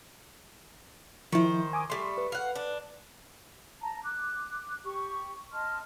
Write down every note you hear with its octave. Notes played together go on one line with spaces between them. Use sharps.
D#3 F3 E4 C5
G#5 D6 D#6
G3 A3 C6
B4
F5 F#5
D4
A5 A#5
D6 F#6
G4 C#6
D#5 A5 C6 F6